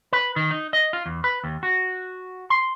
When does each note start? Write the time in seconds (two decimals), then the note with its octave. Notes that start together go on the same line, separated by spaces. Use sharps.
0.13 B4
0.36 D#3
0.51 D#4
0.73 D#5
0.93 F4
1.06 E2
1.24 B4
1.44 D#2
1.63 F#4
2.50 C6